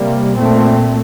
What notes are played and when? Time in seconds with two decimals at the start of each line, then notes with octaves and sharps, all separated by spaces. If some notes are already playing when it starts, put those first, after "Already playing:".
Already playing: C3 G3 A#3
0.36 A#2 A3 C4